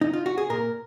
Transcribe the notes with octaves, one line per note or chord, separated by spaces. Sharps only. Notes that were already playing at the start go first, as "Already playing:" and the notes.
D#4
F4
F#4
G#4
A#2 A#4